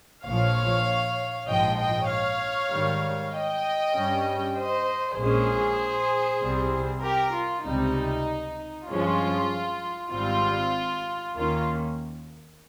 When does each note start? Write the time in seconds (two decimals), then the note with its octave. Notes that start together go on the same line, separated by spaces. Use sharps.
0.24 A#1 A#2 F3 C#5 F5
1.48 A#1 G#2 F3 D#5 G5
1.79 D#5 G5
2.10 C#5 F5
2.71 G#2 D#3 G3
3.33 D#5 G5
3.94 G2 G3 C#4
4.56 C5 D#5
5.17 A#1 A#2 G#3 C#4 G#4 C5
6.42 C2 C3 G3 C4
7.03 G4 A#4
7.34 F4
7.64 C#2 C3 G3 D#4
8.88 G2 F3 G#3 C#4 F4
10.11 G#1 G#2 G3 C4 F4
11.34 D#2 D#3 A#3 C#4 F4